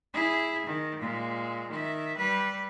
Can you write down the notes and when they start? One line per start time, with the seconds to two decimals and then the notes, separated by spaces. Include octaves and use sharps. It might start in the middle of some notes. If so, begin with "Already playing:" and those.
0.14 E4 G#4
0.67 D#3
1.00 A#2 G#3
1.71 D#3 E5
2.18 G3 B4